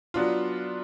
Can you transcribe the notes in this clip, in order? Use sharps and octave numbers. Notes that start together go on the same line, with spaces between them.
F#3 B3 D4 F4